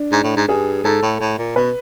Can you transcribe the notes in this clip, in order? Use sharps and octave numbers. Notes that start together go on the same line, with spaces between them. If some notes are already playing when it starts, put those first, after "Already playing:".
Already playing: D4
G#2
A2
G#2
G2 G#4
G#2 A4
A2
A2
A#2
B2 B4